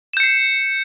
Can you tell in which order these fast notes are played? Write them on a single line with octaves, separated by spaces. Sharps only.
E7 G6 C#7 C7